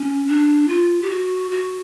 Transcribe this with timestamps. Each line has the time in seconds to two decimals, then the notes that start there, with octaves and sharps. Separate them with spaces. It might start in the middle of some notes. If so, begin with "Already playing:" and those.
Already playing: C#4
0.28 D4
0.68 F4
1.02 G4
1.10 F#4
1.51 F#4